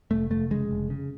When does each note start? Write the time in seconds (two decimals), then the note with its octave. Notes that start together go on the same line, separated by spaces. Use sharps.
0.11 F1 A3
0.30 F1 A3
0.51 C#3 G#3
0.71 F1
0.90 C#3